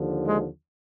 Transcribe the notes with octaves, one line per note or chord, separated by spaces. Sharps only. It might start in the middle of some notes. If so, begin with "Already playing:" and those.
Already playing: D#2 D3 F3
G#3